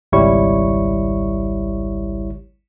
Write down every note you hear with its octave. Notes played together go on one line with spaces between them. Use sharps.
G#1 C#2 G3 E4 C#5 C#6